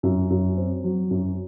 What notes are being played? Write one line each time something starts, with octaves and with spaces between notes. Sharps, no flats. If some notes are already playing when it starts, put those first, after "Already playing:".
F#2
F#2
C4
F#3
F#2